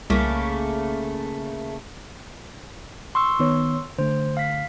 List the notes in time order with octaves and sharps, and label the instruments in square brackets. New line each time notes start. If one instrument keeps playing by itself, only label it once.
[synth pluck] C2 [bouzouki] C#3 A3 A#3
[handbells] C6 C#6 E6
[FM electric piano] D#3 B3 C#5
[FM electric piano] D3 A3 [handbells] C5
[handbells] F5 B6